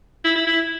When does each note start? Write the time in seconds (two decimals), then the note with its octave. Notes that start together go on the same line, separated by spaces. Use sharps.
0.24 E4
0.35 E4
0.47 E4